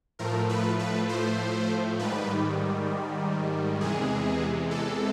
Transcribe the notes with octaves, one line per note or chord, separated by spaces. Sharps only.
A2 F3 A3 A#4
B4
B4
C5
G#2 D#3 G3 B4
E2 C3 E3 G#3 G#4
A4